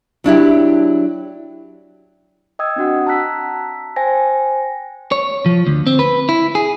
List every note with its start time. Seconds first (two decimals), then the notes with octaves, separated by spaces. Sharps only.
0.24 F#3 D4 E4 G4
2.59 D#5 G5 D#6 E6 G#6
2.76 C4 D4 F#4 F#5
3.07 A5 A#5 E6 F#6 B6
3.96 C5 G5 G#5 A#6
5.12 C#5
5.46 F3
5.66 D2
5.87 C4
5.99 B4
6.29 E4
6.55 G#4